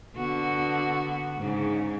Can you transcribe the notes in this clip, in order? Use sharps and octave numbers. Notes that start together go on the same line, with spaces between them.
D3 B3 F#4
G#2 C#3